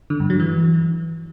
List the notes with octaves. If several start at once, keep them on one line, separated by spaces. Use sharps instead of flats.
D3
G2
F#3
E3